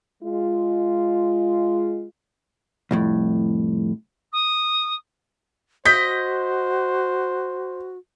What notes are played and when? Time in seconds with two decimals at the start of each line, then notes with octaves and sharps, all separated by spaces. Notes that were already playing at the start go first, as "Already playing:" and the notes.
0.23 G#3 F4
2.91 C2 F2 A2
4.32 D#6
5.85 F#4 C5 D#5 G6 B6